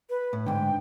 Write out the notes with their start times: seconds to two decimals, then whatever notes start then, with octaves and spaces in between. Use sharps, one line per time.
0.10 B4
0.33 A2
0.46 G#2 D3 G5